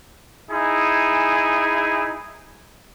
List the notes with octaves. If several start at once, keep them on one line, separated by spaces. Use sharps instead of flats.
D#4 E4 G#4 G#5